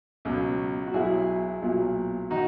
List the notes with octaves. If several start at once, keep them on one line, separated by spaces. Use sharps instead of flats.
C#2 B2 F#3
F#4
B1 B2 F#3 E4 G#4
B1 A#2 F#3
D#3 D#4 F#4